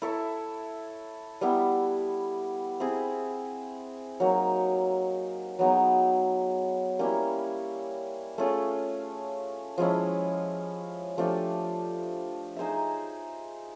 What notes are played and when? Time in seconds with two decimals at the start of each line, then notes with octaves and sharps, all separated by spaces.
0.02 E4 A4 C#5 E5
1.41 G3 B3 E4
2.80 C4 E4 G#4
4.20 F#3 A#3 D#4
5.59 F#3 B3 D#4 G#4
6.99 G3 A#3 C#4 E4
8.38 A3 C#4 F4 G#4
9.78 F3 G#3 C#4 E4
11.18 F3 A3 D4 G4
12.57 D#4 G#4 C5 E5